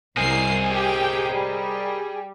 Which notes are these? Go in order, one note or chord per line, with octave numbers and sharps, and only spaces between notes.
C2 G#4 A#4 C5 D#5 C7
G4 G5
G3